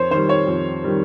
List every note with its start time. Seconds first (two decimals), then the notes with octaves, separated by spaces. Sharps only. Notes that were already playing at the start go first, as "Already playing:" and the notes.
Already playing: F2 C5 C#5
0.11 D#3 G3 C5
0.29 C#5
0.47 F2
0.84 D#3 G3